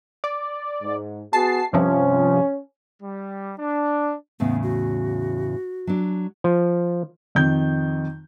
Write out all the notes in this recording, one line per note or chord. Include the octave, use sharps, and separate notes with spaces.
D5
G#2
B3 F#4 G#4 A5 C7
G2 C3 F3 C#4
G3
D4
E2 A2 C#3 B3
F#4
F#3 D4
F3
F2 D#3 G6